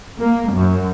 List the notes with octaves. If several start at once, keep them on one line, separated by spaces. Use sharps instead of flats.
A#3
F#2